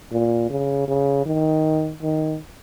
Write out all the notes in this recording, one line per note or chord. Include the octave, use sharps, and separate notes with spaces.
A#2
C#3
C#3
D#3
D#3